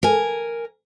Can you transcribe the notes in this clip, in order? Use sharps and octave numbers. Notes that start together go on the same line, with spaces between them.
A#4 G#5